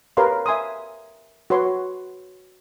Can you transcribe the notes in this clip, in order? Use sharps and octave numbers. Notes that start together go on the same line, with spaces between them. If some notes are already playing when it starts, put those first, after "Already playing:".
G4 A#4 B4 C#5 F5 C6
E5 G#5 C6 D#6
F#4 B4 C#5 C6